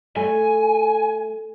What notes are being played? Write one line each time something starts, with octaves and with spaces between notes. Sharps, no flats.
A3 G#5